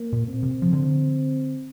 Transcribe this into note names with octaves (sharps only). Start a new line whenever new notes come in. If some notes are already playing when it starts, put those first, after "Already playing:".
Already playing: A#3
A#2
C4
C3
F3
D3